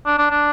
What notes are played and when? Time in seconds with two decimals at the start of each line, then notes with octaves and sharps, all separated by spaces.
0.06 D4
0.18 D4
0.31 D4